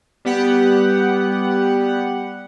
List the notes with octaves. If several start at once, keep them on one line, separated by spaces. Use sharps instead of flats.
G3 B3 G4 F#5